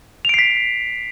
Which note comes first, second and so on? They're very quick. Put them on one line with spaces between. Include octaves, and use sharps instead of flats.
F7 D7 C7 B6